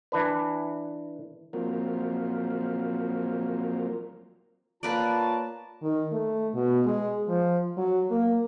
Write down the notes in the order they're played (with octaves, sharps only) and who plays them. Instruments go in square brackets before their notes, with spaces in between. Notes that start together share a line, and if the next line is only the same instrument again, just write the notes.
[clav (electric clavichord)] E3 D4 B4
[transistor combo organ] F3 F#3 A#3 C4 F4 A#4
[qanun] A#3 B4 D5 [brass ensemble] F4 C#5 A5
[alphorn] D#3
A3
B2
G#3
F3
F#3
A#3